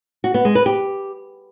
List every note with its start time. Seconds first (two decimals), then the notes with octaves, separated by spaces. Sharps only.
0.24 F#4
0.34 B3
0.45 G#3
0.55 B4
0.66 G4